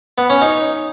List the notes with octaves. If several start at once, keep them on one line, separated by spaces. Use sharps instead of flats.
B3
C#4
D#4